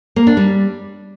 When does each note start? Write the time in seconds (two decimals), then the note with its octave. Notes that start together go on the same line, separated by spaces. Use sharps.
0.16 A#3
0.27 D4
0.37 G3